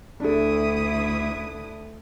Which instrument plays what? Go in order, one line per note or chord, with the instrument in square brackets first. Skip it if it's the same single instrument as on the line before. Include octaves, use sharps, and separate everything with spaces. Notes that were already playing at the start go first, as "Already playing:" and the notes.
[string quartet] D2 E4 D#6 [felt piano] D4 A4